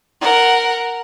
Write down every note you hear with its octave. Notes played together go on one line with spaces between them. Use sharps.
A#4 F#5